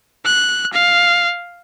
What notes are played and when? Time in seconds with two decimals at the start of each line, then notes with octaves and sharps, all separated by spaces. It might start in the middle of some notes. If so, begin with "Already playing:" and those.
0.25 F#6
0.73 F5